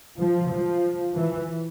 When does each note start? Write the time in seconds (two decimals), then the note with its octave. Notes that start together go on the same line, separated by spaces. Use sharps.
0.17 F3
0.50 F3
1.15 E3